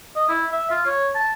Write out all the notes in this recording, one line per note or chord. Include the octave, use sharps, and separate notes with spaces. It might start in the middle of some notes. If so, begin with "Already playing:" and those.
D#5
E4
E5
F4
C#5
A5